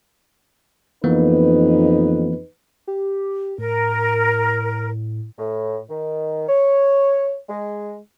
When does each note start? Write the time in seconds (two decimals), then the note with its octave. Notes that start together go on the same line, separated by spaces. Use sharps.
1.04 F2 E3 A#3 B3 D#4 B4
2.88 G4
3.58 A2 A#4
5.39 A2
5.90 D#3
6.49 C#5
7.49 G#3